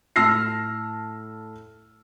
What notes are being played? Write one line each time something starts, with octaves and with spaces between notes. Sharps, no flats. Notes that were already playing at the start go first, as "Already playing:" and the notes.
A2 A5 E6 F6 A#6 C7